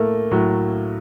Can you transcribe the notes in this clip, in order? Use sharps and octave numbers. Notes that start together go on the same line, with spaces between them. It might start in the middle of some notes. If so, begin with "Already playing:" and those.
Already playing: A2 A3 A#3
A2 F#3